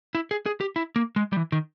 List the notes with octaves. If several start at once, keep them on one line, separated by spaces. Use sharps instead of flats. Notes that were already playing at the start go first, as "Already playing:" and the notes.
E4
G#4
G#4
G4
E4
A#3
G#3
G3
E3
D#3